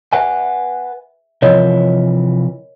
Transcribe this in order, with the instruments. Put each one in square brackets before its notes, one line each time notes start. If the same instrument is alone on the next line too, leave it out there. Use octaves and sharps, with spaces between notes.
[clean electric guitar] B4 F#5 G#5 [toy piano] E5
[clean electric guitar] C3 E3 F3 [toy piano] A#4 C#5 D#5